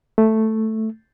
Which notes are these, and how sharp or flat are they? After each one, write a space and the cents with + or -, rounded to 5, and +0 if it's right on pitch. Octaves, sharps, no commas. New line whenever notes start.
A3 +0